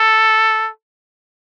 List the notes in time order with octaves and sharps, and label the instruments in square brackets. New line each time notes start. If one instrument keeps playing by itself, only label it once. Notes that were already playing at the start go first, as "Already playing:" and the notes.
Already playing: [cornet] A4